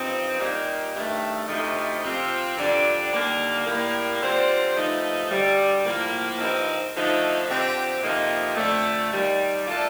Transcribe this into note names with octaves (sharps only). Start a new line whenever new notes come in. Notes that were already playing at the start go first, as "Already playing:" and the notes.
Already playing: G2 F3 C4 D#4
A#2 G3 A#3 D#4 G4
G2 D#3 A3
D2 C3 F3 A3 D#4
C3 F3 C4 F4
F2 D3 G3 D4
D#2 D3 G3 A#3
A2 G3 A#3
D3 G3 C4 F4 C5
G2 F3 A3 D#4
D2 D3 G3
A2 F3 A#3 F4 A#4
G2 F3 C4 D#4 A#4
D3 F3 A3 D#4
D3 F3 C4 G4
F2 C3 F3 A#3 D#4
F2 D3 A3
D#2 D#3 G3
A#2 A3 D4 F4 A4